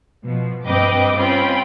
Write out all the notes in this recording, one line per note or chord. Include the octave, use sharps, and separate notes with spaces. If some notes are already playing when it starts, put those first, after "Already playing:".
B2 F3
G2 C4 B4 D#5 G5 D6
C4 C#4 F4 G5 B5